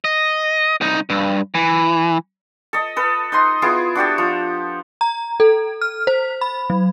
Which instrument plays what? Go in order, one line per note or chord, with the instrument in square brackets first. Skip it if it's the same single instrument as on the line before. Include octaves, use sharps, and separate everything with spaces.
[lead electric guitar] D#5
C2 D#4
G2
E3
[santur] A4 D#5
A4 B4
D#4 D#5 C6
B3 E4 F4 G#4
D4 F#4 G4 A4
F3
[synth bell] A#5
A4
F6
C5
B5
F#3